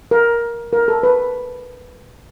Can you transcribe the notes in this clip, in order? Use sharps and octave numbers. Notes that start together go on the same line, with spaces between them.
A#4
A#4
A4
B4